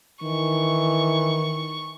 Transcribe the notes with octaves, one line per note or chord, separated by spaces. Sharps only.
D#3 E3 C#6